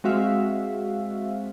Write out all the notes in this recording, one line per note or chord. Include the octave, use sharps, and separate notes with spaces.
G#3 C4 F#4 E5 F5